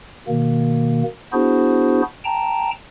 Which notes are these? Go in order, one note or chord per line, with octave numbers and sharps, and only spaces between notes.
B2 D#3 A#3
B3 D4 E4 F#4 G#4 C5
G5 A5 A#5